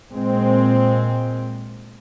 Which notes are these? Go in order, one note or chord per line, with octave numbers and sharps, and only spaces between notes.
A#2 G#3 C4